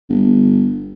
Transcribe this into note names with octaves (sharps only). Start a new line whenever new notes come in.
G1